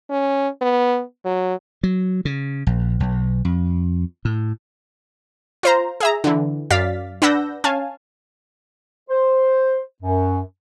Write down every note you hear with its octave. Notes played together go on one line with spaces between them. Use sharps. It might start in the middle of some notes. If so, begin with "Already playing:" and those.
C#4
B3
F#3
F#3
C#3
A#1
B1
F2
A2
F4 C5 A#5
G#4 E5 A#5
D3 E3
F#2 D5 F5 A6 B6
D4 B4 F#5 E6 G6 A#6
C#4 F5 G#5 A5
C5
F#2